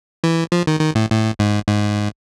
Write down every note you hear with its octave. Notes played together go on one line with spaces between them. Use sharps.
E3
F3
D#3
D#3
A2
A2
G#2
G#2